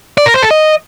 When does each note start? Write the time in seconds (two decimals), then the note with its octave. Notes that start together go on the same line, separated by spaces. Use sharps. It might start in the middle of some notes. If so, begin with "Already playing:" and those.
0.18 D5
0.26 A#4
0.34 C5
0.42 A4
0.51 D#5